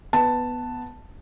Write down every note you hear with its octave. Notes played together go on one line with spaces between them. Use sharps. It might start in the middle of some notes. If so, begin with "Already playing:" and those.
B3 A5